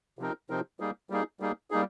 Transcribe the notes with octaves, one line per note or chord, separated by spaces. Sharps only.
C3 F3 C4 D#4 A#4
C3 F3 C4 D#4 A#4
G3 A#3 D#4 G#4
G3 A#3 D#4 G#4
G3 A#3 D#4 G#4
G3 A#3 D#4 G#4